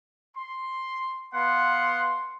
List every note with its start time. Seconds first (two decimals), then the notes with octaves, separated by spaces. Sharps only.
0.36 C6
1.34 B3 F5 F#5 C6